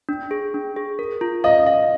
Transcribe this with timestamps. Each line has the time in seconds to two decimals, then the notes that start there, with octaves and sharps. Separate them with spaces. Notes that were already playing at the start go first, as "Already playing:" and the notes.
0.09 D4
0.31 G#4
0.54 D4
0.76 G#4
0.99 A#4
1.21 F4
1.44 D#5 F5
1.67 F5